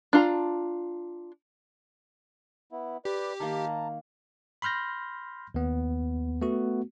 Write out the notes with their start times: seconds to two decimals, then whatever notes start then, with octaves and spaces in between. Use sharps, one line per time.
0.13 D4 F4 A#5
2.72 B3 E4
3.05 G4 B4 D5
3.40 D#3 A#3 A5 A#5
4.62 B5 C6 F6 G6 A#6
5.54 D#2 B3
6.42 A3 B3 F#4